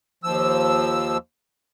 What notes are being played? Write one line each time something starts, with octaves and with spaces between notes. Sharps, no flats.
D#2 F3 E6